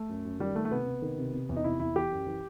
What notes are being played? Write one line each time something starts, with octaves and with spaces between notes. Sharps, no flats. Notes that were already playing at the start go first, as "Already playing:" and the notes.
Already playing: A3
F#2
F#2
D#3 G3
D#3 A3
A3
C3 B3
C3
D#3
C3
C3
E2
D#4
C3 E4
E2 E4
E3 G4
F#2
E3